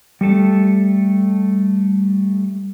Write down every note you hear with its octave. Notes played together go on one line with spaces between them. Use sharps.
G3 A3 A4